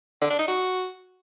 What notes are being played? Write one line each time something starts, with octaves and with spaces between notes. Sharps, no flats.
D3
D4
D#4
F#4